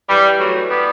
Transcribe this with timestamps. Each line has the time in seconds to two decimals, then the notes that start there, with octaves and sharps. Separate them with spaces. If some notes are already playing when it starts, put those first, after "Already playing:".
0.09 E3 G3
0.39 F#3 A3
0.54 E3
0.70 G3 B3